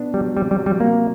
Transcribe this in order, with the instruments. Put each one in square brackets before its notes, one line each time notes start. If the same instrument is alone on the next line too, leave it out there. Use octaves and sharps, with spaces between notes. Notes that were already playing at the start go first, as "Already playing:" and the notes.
Already playing: [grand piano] B2 B3 D4
[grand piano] F#3 [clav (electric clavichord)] G3
[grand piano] C3 [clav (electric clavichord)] G3
[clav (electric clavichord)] G3
[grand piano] F#3
[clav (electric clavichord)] G3
[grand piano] C3 [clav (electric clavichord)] A#3